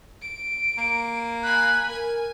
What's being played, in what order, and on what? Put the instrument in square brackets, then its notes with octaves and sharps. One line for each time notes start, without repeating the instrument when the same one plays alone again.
[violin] D7
[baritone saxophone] A#3
[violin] G#5 B5 [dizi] F#6
[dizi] A#4 [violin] G#5